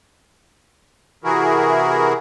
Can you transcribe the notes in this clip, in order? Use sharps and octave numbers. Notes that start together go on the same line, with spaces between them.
C3 E3 E4 F#4 G#4 A#4